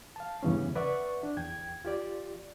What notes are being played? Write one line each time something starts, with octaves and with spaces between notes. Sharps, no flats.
F5 A5
E2 G2 C#3 E3 B3 C#4
B4 D5 E5 F#5 C#6
D4
E2 G5 G#6
F4 G4 D5